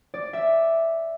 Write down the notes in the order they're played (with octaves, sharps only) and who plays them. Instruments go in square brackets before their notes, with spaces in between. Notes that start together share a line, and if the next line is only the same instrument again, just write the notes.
[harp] D5
E5